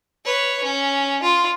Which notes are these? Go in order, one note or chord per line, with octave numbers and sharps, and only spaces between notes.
B4 C#5
C#4
F4